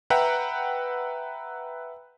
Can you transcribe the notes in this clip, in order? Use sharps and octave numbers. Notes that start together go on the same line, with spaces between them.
B4 E5 F#5 G5 A#5